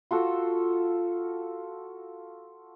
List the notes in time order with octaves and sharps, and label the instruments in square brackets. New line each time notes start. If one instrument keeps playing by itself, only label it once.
[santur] F4 F#4 A4